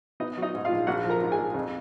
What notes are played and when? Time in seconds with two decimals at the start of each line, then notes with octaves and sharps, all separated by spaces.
0.20 B3 D#4 D#5
0.38 F#3 D#4 D#5
0.54 G#2
0.65 F4 F5
0.71 A#1
0.87 A#1 F#4 F#5
1.04 F3
1.10 A#4 A#5
1.21 G#2
1.32 G#4 G#5
1.38 A#1
1.54 F2